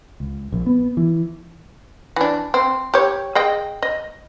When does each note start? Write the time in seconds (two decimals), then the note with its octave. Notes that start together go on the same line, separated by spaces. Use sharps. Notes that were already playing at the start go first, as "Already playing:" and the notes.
0.20 C#2
0.52 A#1
0.66 B3
0.97 E3
2.16 E3 D4
2.54 C4
2.94 G4 C#5
3.35 G#4 D#5 G5
3.82 D#5